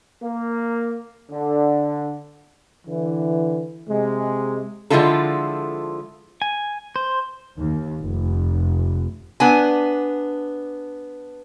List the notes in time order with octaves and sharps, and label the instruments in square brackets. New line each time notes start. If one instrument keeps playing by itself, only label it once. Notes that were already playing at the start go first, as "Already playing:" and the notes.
[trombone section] A#3
D3
D3 E3
C3 G#3
[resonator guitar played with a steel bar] D3 F3 G#3 E4 F4 A4
[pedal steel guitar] G#5
C5
[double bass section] D#2
F1
[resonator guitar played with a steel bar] B3 D4 G#5